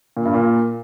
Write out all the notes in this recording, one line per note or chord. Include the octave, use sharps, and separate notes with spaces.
A#2
G2
A#2